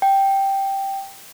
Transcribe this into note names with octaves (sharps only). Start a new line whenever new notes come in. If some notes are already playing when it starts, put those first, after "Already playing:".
G5